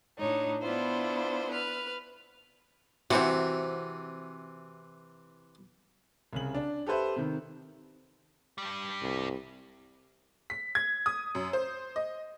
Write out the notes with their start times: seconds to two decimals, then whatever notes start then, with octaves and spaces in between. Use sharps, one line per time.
0.19 A2 D4 D#4 C#5
0.62 B3 D4 E4 F4 C5
1.51 B4 F6
3.11 C3 E3 C4 F#4
6.33 C2 C#3 F#7
6.55 D4
6.87 G4 A4 B4 C5 E5
7.16 C3 D#3
8.58 G2 G3
9.02 C2
10.50 B6
10.75 G#6
11.06 D#6
11.35 F#2
11.53 C5
11.96 D#5